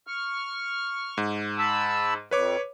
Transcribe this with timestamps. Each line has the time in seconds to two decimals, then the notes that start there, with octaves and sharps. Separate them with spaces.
0.07 C#6 F6
1.18 G#2
1.58 A5 B5 E6
2.31 F2 B4 C#5 D6